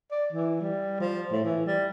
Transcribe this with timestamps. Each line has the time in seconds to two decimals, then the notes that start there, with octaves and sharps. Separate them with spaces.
0.11 D5
0.33 E3
0.61 G3
1.00 F3
1.32 A2
1.44 E3
1.66 G3